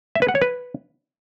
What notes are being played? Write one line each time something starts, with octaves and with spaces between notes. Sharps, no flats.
E5
B4
F#5
C#5
B4